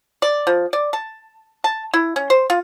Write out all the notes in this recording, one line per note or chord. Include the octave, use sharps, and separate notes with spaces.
D5
F3
D5
A5
A5
E4
C#4
C5
F4